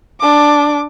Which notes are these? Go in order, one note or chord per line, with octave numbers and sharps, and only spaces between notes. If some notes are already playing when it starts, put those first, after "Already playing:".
D4 D6